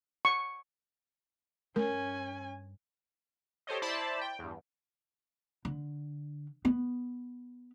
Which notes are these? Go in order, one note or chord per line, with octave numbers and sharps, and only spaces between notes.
C#6
G2 C#4 A#4 G#5
G4 A4 C5 C#5 D#5
E4 C5 D5 A5 B5
G5
E2 G2
D3
B3